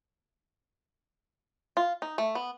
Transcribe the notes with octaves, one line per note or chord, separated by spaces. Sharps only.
F4
D#4
A3
B3